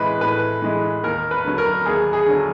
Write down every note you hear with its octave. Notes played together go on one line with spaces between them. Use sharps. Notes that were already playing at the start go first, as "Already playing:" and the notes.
Already playing: A2 E3 G#3 B4
A2 B4
E3 G#3
D#2 A#4
B4
D3 F#3
A#4
D#2 G#4
G#4
D3 F#3